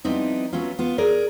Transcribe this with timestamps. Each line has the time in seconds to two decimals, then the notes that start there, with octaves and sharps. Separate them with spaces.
0.04 F3 G3 B3 C4 D#4 E4
0.53 E3 F#3 B3 C#4 F4
0.79 B3 F4
0.98 G#4 A#4 D5